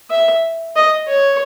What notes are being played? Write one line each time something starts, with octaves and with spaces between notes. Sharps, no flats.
E5
D#5
C#5